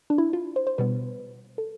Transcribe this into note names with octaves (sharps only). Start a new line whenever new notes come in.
D4
E4
F4
C5
C5
B2 G3 B3 B4
A4